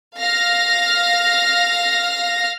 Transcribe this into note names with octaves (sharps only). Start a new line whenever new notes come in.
F5 F6 A#6